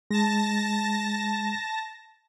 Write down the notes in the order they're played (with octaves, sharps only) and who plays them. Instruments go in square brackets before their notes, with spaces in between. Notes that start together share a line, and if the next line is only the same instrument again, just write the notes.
[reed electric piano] G#3 [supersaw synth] A5 A#6